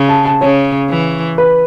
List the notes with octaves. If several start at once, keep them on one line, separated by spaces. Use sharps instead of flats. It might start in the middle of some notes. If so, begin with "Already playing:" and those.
Already playing: C#3
A5
A5
C#3 C#5
E3
B4